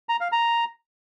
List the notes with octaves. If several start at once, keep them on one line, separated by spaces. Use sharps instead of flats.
A#5
F5
A#5